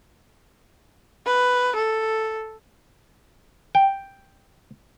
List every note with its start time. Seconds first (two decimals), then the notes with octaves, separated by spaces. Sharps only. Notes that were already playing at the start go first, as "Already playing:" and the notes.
1.27 B4
1.76 A4
3.75 G5